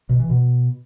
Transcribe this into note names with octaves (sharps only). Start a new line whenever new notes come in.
B2
E3
B2